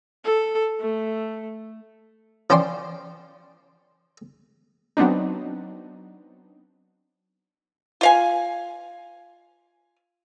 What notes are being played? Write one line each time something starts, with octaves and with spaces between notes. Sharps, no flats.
A4
A3
F3 C#4 C5 D5 G5 C6
F#3 B3 C4 D4 D#4
F4 F5 G#5